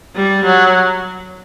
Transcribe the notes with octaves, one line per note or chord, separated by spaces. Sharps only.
G3
F#3